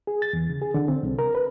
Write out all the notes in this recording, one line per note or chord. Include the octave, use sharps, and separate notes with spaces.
G#4
A6
E2
C#3
G#4
D3
C4
C2
A#4
B4